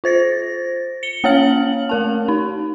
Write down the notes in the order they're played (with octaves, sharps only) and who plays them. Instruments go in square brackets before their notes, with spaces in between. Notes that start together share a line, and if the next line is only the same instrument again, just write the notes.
[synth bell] F4 C5 A6 A#6
C#7 G7
A#3 C#4 C#5 F5 F6 F#7
A3 A#4 A5
D#4